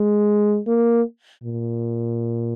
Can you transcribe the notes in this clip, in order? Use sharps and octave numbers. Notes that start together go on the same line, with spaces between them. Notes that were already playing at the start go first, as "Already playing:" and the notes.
Already playing: G#3
A#3
A#2